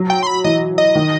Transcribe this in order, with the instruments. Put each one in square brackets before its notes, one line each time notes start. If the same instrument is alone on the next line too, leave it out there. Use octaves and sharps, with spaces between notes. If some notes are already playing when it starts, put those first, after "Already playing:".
Already playing: [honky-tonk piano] F#3
[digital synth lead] G5
C6
B5
[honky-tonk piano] E3 [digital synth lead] D#5
[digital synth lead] D#5
[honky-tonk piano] D#3